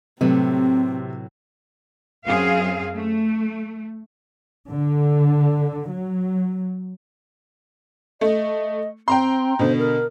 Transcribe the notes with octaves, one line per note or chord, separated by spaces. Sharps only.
A2 C3 F#3 C4 B4
F#2 C4 G#4 F5
A3
D3
F#3
A3 D#5
C4 G5 A#5 C6
B2 D3 C5
A#4